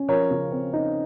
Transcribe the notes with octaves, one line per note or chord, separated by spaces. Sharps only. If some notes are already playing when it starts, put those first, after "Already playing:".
Already playing: C#4
F3 A#4 C#5
C#3
C4
D#4